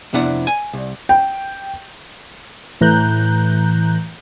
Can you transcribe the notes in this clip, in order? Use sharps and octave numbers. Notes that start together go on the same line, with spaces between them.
F2 C3 B3 D4 E4 F#5
G#5
C2
G5
A2 E3 A#5 F#6 G6